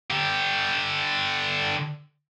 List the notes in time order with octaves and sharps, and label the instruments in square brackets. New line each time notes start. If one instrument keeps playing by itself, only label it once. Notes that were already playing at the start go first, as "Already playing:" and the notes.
[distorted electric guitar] D3 G4